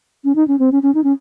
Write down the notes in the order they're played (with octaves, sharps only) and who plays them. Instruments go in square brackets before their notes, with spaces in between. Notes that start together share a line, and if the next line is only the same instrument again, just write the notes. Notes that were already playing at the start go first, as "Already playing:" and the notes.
[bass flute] C#4
D#4
C#4
C4
C#4
C#4
D#4
C#4